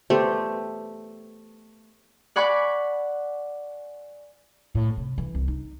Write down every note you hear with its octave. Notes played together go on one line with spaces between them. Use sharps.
A3 B3 G4 C5
D5 F#5 G#5 B5 C#6 D6
A2
C3
E3
C2
D#4